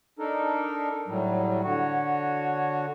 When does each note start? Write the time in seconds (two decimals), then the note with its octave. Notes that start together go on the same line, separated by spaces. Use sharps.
0.19 D4 D#4 A4 A#4
1.08 A2 F#3 G3
1.64 D3 F#4 C#5